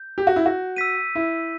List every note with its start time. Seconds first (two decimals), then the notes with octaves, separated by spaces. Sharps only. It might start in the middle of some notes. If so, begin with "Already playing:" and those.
Already playing: G6
0.18 G4
0.27 F#4
0.36 E4
0.46 F#4
0.76 E6 B6 D#7
1.15 E4